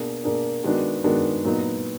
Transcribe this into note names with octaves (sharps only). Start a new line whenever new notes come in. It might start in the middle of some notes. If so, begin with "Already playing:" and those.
Already playing: B2 A#3 D4 G#4
B2 A#3 D4 G#4
D#3 G#3 B3 D4 F#4
D#3 G#3 B3 D4 F#4
A#2 F#3 B3 D#4